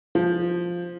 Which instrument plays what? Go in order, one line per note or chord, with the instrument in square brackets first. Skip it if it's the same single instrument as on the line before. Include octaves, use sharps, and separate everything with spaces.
[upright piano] F3